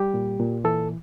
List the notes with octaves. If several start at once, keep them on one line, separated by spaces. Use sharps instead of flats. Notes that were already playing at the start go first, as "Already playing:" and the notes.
Already playing: G3 G4
A#2
A#2
E3 A4